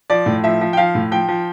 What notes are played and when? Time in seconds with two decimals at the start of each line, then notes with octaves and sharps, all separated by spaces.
0.10 F3 D5
0.26 A2
0.44 F3 E5
0.61 F3
0.73 G5
0.77 F3 F5
0.95 A2
1.12 F3 G5
1.28 F3